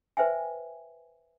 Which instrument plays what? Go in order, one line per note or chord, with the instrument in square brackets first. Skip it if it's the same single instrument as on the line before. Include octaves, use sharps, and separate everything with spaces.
[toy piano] B4 C5 E5 G5 G#5